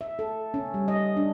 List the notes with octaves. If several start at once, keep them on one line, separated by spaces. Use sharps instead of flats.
E5
A4
C#4
G3
D#5
D4